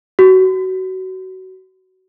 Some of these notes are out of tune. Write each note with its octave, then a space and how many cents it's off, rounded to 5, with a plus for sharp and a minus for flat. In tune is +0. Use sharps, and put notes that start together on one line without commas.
F#4 +25